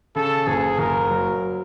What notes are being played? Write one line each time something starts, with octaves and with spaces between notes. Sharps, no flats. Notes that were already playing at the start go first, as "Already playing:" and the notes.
C#3 A4
F#1 G#4
F#1 A#4
F#3